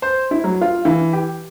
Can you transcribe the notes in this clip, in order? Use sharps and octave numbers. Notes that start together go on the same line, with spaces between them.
C5
E4
F#3
F4
E3
G4